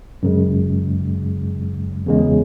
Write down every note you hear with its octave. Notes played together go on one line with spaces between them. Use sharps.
F#2 C#3 G#3
E2 C#3 G#3